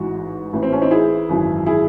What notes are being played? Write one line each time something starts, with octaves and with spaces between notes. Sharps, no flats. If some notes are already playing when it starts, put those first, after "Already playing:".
Already playing: A1 G#2 E3 F#4
A1 A2 E3
C4
A3 C#4
C4 D#4
E4 G#4
G#1 F#2 E3
E4 G#4